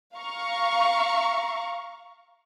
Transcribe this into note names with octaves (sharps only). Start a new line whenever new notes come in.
F5 A#5 C#6